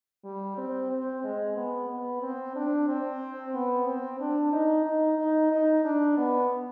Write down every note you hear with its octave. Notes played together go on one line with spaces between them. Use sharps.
G3
C4
C4
G#3
B3
B3
C4
D4
C4
B3
C4
D4
D#4
D#4
D#4
D#4
D4
B3